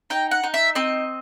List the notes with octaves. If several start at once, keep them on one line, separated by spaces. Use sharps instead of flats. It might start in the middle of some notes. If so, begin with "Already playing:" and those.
D#4 G5
F#5
D#4
E5
C4 D#5